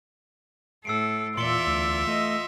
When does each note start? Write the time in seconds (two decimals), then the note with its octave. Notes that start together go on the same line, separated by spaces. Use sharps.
0.85 A2 A4 E6 C7 D7
1.37 E2 A#2 F4 D5 E5 C6 C#7 G7
1.67 D2
2.07 A3 D#5